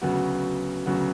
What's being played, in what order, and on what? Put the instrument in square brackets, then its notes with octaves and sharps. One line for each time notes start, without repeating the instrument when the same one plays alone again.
[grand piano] D2 C#3 F#3 B3 F#4
D2 C#3 F#3 B3 F#4